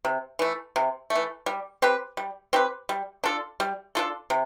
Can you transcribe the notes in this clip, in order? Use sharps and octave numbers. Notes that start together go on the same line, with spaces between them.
C3
E3 A3
C3
A3
E3
G3
C4 G4 B4
G3
C4 G4 B4
G3
D4 F4 A4
G3
D4 F4 A4
C3